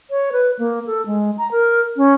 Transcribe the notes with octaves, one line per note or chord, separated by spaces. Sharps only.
C#5
B4
A#3
A4
G#3
A#5
A#4
C#4